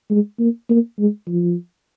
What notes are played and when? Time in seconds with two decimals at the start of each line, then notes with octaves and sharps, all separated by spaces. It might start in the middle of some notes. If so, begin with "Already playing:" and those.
0.11 G#3
0.39 A#3
0.70 A#3
0.99 G#3
1.28 F3